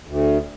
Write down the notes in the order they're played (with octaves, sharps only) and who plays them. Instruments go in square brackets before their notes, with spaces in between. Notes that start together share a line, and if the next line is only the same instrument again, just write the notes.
[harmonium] D2